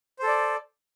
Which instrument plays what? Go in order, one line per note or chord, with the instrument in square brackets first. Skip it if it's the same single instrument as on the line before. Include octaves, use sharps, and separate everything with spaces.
[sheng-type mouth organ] C5
A4
D5